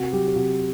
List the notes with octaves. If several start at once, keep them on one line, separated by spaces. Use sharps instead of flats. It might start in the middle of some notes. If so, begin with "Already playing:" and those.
Already playing: C3 F#4
F#3 G4
G4
C3 F#4